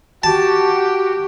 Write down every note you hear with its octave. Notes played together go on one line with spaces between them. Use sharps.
F#4 G4 A5